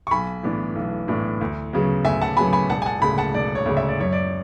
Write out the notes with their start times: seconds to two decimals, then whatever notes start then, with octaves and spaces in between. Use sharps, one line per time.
0.07 C#6
0.11 B1 G#5 B5
0.43 A2 E3 B3 D4
0.75 B1
1.08 A2 E3 B3 D4
1.41 D2
1.73 C#3 F#3 B3
2.05 D2 E5 G#5
2.22 F#5 A5
2.37 C#3 F#3 B3 G#5 B5
2.53 G#5 B5
2.70 E1 F#5 A5
2.82 G#5
2.86 F#5 A5
3.02 D2 C#3 G#5 B5
3.18 F#5 A5
3.34 E1 D5
3.55 C#5
3.66 D2 C#3
3.77 E5
3.89 D5
3.99 F#2 C#5
4.12 D5